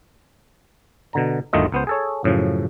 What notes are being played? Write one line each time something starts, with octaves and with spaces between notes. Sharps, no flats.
B2 D3 A#5
G1 D2 D#3 A3 F4 D#5
C#2 B3 C5
G#4 A4 C#5
F#2 A2 C#3 F3